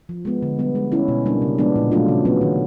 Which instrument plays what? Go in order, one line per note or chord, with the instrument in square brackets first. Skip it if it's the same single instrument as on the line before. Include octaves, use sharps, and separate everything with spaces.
[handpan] F3
G#3 B3
D3
G3 B3
G#3
C#4 E4
B2
G3 A#3 D4
C#3
F3 G#3 B3 D4
A#2
F#3 A3 D4 F4
C#3
F#3 B3
D#3